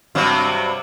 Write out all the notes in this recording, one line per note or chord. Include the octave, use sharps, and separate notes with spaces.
G2 C3 F#3